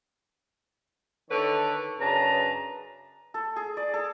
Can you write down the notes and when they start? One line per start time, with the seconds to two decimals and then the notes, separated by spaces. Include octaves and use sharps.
1.30 D3 D#3 A4 B4 C#5
2.00 F#2 C#3 D4 B4 A5 A#5
3.34 A4
3.56 G#4
3.77 D5
3.94 A4